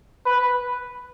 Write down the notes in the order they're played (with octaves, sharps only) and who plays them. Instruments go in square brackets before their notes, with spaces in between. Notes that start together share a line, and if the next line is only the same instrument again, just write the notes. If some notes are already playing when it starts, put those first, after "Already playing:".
[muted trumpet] B4